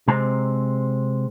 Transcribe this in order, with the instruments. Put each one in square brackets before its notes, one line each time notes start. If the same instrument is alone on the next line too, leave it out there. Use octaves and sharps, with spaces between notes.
[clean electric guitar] C3 G#3 C4 A#5